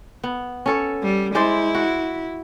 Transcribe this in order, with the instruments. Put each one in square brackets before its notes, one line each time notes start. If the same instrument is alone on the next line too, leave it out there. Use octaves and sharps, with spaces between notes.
[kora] B3
C#4 A4 C#5
[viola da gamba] G3
[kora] G#3 C5 D5 [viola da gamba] E4
[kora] F#4